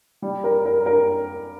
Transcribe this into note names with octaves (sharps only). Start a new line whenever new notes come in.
G3
A#4
A#4
A#4